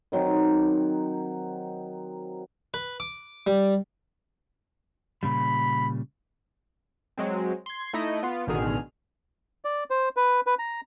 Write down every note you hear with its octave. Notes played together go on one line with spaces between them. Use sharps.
D#3 F#3 C4 D#4
B4
D6
G3
A#2 C#3 G3 B5
F#3 G#3 C4
C6 G#6
A3 D#4 E4 D#5
B3 F4
A1 B2 D3 D#3 G#4 F6
D5
C5
B4
B4
A#5